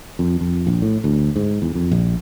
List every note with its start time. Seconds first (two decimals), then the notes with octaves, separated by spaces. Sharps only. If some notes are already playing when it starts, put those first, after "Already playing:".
0.19 F2
0.41 F2
0.67 A#1
0.82 A2
1.04 D2
1.36 G#2
1.62 E2
1.75 F2
1.92 A#1